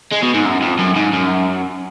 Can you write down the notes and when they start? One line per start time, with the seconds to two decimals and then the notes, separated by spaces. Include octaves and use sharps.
0.12 G#3
0.22 B2
0.34 G#2
0.45 F#2
0.62 F2
0.79 F#2
0.96 G#2
1.13 F#2